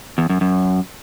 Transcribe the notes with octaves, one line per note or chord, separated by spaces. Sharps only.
E2
F#2
F#2